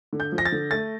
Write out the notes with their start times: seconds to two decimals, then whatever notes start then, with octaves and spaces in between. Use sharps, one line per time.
0.13 D3
0.20 G6
0.32 F3
0.38 A#6
0.45 A6
0.52 D3
0.71 A3 A6